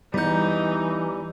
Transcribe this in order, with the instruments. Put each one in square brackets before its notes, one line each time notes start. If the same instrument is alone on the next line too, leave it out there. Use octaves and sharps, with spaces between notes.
[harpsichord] E2 F#5 [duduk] E3 [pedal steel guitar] G3 G6 [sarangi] D#4